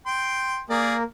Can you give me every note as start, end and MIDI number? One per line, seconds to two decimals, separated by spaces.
0.06 0.61 79
0.06 0.61 84
0.70 1.03 58
0.70 0.96 68
0.70 1.03 70
0.70 0.96 74